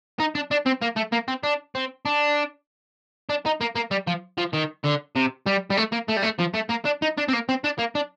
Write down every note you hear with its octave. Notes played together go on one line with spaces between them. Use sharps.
D#4
D4
D4
C4
A#3
A3
A#3
C4
D4
C4
D4
D4
D#4
A#3
A#3
G3
F3
F3
D#3
D3
C3
G3
G3
A3
A#3
A3
G3
A3
F3
A3
A#3
D4
D#4
D4
C4
A#3
C4
D4
A#3
D4